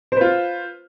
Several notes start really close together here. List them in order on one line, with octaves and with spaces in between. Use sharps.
C5 B4 F4